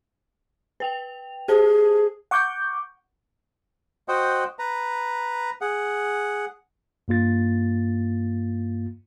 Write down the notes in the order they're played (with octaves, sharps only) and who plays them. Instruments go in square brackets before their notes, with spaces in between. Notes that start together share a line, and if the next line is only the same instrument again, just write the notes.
[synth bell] B4 G5 F7
[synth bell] G4 C5 A5 [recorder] G#4
[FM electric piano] F#5 C#6 D6 G6
[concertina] F#4 C5 D#5 F#5 G5
B4 A#5
G#4 F#5
[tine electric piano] G2 A#3 F4 A6